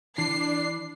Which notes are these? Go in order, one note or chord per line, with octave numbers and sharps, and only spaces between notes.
E3 D4 C7